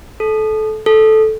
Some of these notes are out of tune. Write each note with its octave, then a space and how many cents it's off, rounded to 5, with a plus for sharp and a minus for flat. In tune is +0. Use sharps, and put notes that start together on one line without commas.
A4 -25
A4 -10